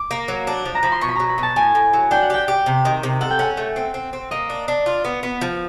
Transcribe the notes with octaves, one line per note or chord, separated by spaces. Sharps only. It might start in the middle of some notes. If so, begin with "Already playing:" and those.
Already playing: D6
A#3
F#3
D4
F3
A#5
F3 B5
C6
B2 C#6
B5
F#3 A#5
B5
B2
A5
A2 G#5
A2
F#3
D4 G5
F#5
G4 G5
G4
C3
D#3
C3
A4 F#5
G5
C#4 F#5
A3
C4
C4
C4
A#3 D#5
D4
D4
F4
B3
B3
F3